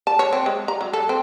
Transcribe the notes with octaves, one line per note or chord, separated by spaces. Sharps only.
A5
C#5
C4
G#3
A#5
F#3
A4
C4